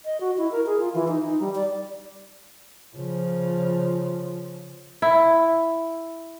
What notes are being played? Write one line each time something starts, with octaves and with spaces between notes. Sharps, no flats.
D#5
F#4
E4
A#4
G#4
F4
E3
D#4
D#4
G3
D5
C#3 F3
E4